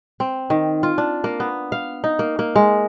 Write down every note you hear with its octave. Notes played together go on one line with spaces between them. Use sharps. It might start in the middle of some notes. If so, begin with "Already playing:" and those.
C4
D#3
F4
D4
A#3
B3
F5
D#4
A#3
A#3
G#3